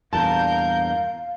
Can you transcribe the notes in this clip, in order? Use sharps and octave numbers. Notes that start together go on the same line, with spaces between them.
E2 G2 A#2 A#4 F5 A5 G6